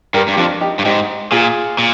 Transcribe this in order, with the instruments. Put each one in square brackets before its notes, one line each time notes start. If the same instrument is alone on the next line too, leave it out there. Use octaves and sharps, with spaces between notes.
[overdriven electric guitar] G2 [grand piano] G4 A#4
[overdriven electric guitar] G2
[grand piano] G4
[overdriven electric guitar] F2 [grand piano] D4 F4
[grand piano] D#4 G4
[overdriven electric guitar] G2
[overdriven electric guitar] G#2 [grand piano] D#4 G4
[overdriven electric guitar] A#2 [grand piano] F4 G#4
[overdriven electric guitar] A#2